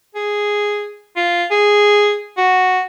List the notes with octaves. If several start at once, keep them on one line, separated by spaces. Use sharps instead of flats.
G#4
F4
G#4
F#4